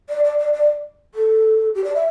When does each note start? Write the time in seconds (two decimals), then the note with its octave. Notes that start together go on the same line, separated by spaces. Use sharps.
0.09 D5
0.24 D5
0.39 D5
0.54 D5
1.15 A4
1.75 G4
1.84 D5
1.95 E5